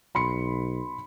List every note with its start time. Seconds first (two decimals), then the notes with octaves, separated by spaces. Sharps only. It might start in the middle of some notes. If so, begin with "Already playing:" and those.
0.15 B1 B5 C6 C#7